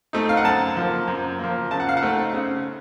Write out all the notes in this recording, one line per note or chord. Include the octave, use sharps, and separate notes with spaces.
A3 C4 D#4
F5
F#5
F#2 A5
F3 A#3
F#2
F3 A#3
C#3 A5
F#5
F5
F#5
A3 C4 D#4
C#3